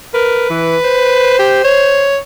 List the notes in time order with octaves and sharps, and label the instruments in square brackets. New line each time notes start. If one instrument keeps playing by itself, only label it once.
[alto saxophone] A#4 [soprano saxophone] B4
[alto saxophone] E3
C5
[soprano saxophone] G4
C#5